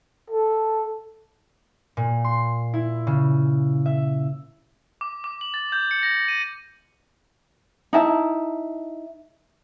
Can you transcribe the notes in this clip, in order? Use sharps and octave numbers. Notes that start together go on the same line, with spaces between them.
A4
A#2
C6
E4
C#3
E5
D6
D6
F#7
A6
G6
C#7
A#6
D#7
D#4 E4 A5